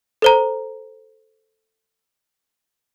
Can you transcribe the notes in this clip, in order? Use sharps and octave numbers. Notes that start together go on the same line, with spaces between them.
A4 C5 A#5